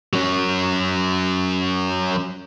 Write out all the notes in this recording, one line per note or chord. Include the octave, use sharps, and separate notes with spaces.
F#3 C#4